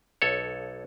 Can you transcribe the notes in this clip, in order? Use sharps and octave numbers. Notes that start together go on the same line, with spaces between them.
B1 A4 C#5